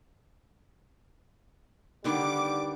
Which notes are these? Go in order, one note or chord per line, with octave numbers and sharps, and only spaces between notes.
D3 D#3 G3 B3 D6